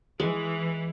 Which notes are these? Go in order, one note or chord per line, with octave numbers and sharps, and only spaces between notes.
E3 G#3